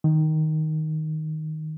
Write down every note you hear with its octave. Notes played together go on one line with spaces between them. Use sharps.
D#3